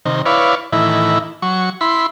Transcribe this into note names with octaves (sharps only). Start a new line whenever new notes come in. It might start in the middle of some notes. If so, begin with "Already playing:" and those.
C3 D#3
E4 B4 C#5 D5 F5
A2 D#3 E3 E4
F#3 C#6
E4 B5 C6